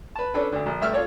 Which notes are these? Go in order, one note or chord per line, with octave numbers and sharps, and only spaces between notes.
B4 A5
C#4 D4 A4 B4
D2 D3
A#1
G2 A3 E5 E6 F6
F4 A4 C#5 D5